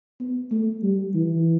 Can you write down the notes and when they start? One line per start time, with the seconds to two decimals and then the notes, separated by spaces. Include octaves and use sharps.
0.20 B3
0.51 A3
0.83 G3
1.15 E3